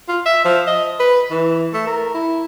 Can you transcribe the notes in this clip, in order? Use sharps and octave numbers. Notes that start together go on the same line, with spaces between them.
F4
E5
F3
D#5
B4
E3
A3
A#4
E4